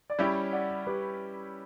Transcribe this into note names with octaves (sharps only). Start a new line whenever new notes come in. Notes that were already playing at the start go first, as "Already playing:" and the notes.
D5
G3 C#4 E4 G4 C#5 E5
D5 F#5
G4 B4